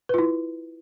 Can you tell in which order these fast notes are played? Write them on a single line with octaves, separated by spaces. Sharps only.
B4 F4 E4